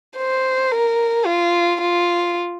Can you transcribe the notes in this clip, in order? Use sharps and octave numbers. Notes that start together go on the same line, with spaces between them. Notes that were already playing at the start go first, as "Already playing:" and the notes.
C5
A#4
F4
F4